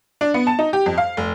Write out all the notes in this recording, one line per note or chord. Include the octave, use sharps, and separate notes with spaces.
D4
B3
A5
D#4
G4
F2
F5
F1